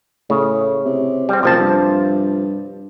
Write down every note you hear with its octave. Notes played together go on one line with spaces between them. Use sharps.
A2 C#3
C3
G3 C4
F#1 C3 F3 A5
G2